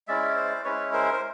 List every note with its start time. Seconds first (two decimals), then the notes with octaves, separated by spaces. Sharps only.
0.08 G#3 C#4 E4 D5 E5
0.36 C5 D5
0.64 G#3 C#4 E4 B4 C#5
0.93 A#4 C5
1.13 C5